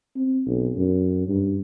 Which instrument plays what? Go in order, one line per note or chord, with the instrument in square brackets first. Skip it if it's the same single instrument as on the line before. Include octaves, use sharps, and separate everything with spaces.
[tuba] C4
B1
F#2
G2